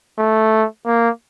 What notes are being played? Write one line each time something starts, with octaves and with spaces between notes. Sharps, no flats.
A3
A#3